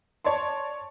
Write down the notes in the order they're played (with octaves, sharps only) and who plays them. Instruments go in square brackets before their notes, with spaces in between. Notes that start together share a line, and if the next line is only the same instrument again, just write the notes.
[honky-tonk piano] C#5 D5 A5 C6